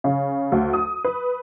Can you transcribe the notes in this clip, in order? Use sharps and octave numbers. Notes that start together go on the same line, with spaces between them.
C#3
D2
D#6
B4